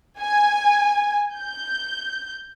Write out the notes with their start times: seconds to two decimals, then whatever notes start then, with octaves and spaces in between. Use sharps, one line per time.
0.21 G#5
1.37 G6